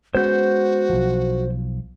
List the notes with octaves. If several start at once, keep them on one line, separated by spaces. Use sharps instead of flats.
G#3 B3 C#4 F#4 C5 G6
B1 F3